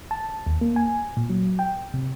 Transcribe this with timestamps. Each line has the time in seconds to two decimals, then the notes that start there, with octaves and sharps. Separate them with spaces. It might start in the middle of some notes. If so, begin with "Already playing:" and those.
0.11 A5
0.47 D#2
0.61 A#3
0.76 G#5
1.17 A#2
1.30 F#3
1.59 G5
1.94 C3